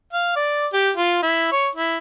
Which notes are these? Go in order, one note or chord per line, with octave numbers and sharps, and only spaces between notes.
F5
D5
G4
F4
E4
C#5
E4